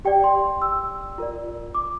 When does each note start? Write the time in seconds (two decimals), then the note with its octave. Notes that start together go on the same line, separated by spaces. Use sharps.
0.05 G4 D5 G5
0.24 C6
0.62 E6
1.18 F4 A#4 D5
1.75 D6